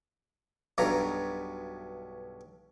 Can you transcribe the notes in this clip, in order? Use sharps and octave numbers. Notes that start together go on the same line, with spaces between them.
B1 G2 B2 A#5